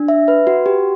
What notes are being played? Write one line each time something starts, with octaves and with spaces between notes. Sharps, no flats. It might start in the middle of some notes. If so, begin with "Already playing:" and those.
Already playing: D4
E5
B4
F#4
G4